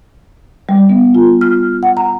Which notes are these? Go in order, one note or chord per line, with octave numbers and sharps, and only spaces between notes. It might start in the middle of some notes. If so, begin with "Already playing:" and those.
G3
B3
F4
F6
F#5
A#5